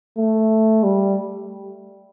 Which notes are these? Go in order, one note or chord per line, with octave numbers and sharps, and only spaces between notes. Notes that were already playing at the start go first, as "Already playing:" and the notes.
A3
G3